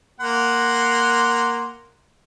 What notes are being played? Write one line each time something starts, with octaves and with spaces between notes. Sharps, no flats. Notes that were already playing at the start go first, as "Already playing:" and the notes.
A#3 F#5 C6